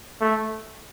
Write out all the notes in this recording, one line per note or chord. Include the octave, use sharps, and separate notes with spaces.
A3